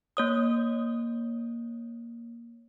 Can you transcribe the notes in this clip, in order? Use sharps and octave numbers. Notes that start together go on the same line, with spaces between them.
A#3 C#5 D#6